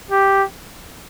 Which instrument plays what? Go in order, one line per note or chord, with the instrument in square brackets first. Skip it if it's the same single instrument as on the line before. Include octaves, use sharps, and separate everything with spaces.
[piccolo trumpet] G4